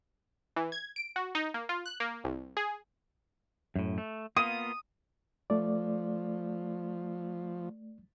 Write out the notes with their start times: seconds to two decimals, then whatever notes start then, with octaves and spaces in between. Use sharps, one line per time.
0.56 E3
0.72 G#6
0.96 D7
1.16 F#4
1.35 D#4
1.54 A#3
1.69 F4
1.86 F#6
2.00 A#3
2.24 C2
2.57 G#4
3.76 F#2 A2
3.98 A3
4.36 A#3 B3 F4 D#6
5.50 F3 A3 D5